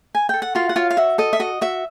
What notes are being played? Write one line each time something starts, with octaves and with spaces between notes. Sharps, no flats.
G#5
A4 G5
F#5
F4 F#4 F5
F#5
F4 C#5 F5
F5
F#4 E5
A4 D#5
E5
F#4 D#5
F#4 E5